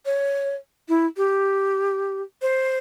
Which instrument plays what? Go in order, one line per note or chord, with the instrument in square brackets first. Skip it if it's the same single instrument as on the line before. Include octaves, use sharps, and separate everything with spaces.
[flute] C#5
E4
G4
C5